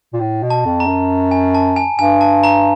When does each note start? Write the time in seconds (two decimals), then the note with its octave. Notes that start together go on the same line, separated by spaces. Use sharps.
0.13 A#2
0.20 A2
0.43 B2
0.50 A5
0.65 F2
0.80 A#5
0.86 F#2
1.31 G#5
1.55 A5
1.76 G#5
1.99 G2 G#5
2.21 A5
2.44 A#5